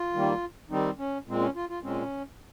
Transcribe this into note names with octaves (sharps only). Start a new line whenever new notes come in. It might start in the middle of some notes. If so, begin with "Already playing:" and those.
Already playing: F4
D#3 G3 A#3
D#3 G3 C4 D#4
C#4
A#2 G#3 C4
C#4
F4
F4
A#2 G#3 C4 C#4